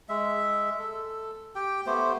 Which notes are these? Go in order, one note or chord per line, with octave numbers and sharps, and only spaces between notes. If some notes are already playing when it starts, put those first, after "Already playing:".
G#3 E5
A4
G4 G5
A3 B3 G4 C5